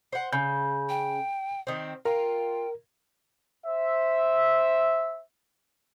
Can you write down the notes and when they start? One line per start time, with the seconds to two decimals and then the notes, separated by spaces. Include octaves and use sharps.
0.12 C5 F#5
0.33 C#3 G6
0.89 G5
1.67 D#3 C4
2.05 F4 A#4 G5
3.64 C5 E5